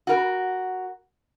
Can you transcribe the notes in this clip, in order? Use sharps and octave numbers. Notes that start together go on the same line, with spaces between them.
F#4 A#4